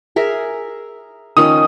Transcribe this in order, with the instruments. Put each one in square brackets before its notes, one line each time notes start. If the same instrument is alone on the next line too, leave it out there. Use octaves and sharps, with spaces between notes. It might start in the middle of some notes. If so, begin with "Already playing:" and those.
[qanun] G#4 A#4 E5
[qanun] D#3 F3 C#4 [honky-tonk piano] D#6